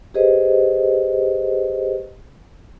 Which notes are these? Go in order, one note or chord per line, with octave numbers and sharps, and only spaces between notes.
G4 G#4 B4 C5 D#5